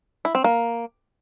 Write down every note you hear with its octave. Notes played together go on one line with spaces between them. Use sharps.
E4
C4
A#3